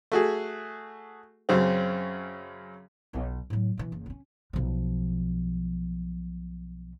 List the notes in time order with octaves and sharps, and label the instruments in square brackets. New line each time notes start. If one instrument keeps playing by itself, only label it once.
[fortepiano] A3 F#4 G#4
F#2 C#3 C4
[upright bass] B1 F4
A2 F#3
B2 E3
F#1
D3 C#4
B1 F3